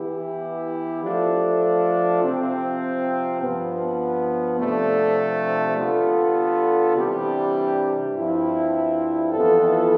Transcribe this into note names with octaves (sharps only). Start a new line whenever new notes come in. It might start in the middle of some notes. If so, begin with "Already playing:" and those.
Already playing: E3 B3 E4 G4
F3 A3 D4 F4 A4
C3 F3 C4
G2 F3 B3
C3 F3 A3 D4 A4
D3 G3 B3 F4 A4
C3 E3 G3 D4 G4
G2 F3 C4 E4
F2 E3 B3 F4 A4